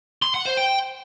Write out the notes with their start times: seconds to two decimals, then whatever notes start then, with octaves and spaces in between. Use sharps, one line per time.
0.22 C6
0.34 F#5
0.45 C5
0.57 G5